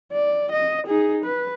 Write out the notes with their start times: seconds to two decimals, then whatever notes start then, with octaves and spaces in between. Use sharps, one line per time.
0.12 D5
0.52 D#5
0.87 D#4 G#4
1.24 B4